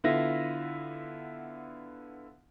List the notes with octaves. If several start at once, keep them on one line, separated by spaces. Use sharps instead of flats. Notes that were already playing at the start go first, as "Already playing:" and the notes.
D3 B3 E4 F4 E5 A#6